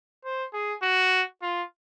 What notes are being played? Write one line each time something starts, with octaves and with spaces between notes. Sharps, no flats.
C5
G#4
F#4
F4